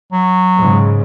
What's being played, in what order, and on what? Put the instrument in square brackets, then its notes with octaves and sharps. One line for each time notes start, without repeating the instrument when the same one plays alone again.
[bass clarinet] F#3
[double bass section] G#2 C#3